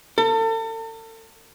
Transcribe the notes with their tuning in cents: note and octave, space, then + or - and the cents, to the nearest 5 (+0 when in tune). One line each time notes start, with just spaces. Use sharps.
A4 +40